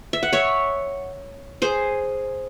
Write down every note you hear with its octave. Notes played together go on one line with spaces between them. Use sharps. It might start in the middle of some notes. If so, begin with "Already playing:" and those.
E5
F#5
C#5 E5
G#4 C5